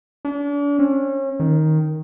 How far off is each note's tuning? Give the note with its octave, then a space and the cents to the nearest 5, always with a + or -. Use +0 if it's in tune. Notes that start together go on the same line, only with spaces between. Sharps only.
D4 -40
C#4 -35
D#3 +5